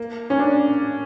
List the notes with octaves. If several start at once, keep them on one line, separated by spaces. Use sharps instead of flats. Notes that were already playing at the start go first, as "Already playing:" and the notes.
Already playing: A#3
C#4
D4